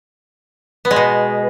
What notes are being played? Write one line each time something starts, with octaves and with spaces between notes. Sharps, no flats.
B3
G#3
B2